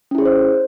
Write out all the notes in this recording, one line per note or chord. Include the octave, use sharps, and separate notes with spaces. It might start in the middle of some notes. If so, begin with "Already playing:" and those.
C#4 E4 G#4 C5 C#5